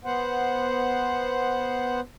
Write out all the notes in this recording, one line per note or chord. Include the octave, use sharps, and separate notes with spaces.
B3 C5 F#5